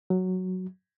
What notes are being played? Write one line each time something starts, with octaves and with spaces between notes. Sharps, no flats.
F#3